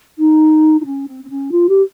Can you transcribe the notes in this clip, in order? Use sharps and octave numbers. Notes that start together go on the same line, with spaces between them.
D#4
D#4
C#4
C4
C4
C#4
F4
G4